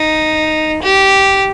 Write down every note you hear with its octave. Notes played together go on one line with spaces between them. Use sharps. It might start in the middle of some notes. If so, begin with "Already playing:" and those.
Already playing: D#4
G4